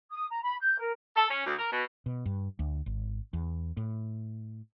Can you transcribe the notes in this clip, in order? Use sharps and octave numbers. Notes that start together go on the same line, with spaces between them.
D#6
A#5
B5
G6
A#4
A4
C#4
D2
A#4
B2
B2
G2
D2
G#1
E2
A2